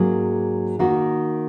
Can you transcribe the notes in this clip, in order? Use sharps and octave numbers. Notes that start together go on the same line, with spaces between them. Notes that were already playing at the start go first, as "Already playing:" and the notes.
Already playing: G#2 F#3 A#3 C#4 G#4
D#3 A#3 D#4 F#4